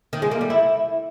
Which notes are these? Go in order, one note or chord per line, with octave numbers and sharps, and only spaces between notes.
D#3
G#3
A#3
G3
E4